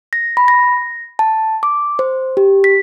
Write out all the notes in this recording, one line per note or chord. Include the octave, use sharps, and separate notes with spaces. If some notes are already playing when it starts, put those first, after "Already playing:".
A#6
B5
A#6
A5
D6
C5
G4
B6